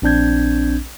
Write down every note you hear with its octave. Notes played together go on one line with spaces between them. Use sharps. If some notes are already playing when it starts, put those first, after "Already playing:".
A#1 C4 D4 G6 G#6